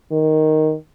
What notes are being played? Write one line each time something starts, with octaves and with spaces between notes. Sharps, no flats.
D#3